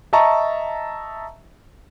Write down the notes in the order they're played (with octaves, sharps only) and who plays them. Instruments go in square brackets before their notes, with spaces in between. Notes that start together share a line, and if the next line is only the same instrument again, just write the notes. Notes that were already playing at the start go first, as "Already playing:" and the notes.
[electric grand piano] D#5 E5 A5 A#5 C#6